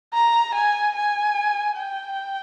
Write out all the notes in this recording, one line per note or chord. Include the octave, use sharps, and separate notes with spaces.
A#5
G#5
G#5
G5